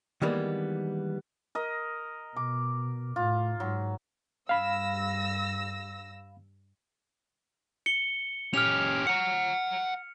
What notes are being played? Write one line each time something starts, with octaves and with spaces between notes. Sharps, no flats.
D#3 E3 G3 G#3 A#3 B3
A#4 D#5
B2 D6
A2 F4
G#2 F#3
G2 F5 B5 E6 A#6
C#7 G7
C#4 G4 F6 F7
F#5 A#5 C#7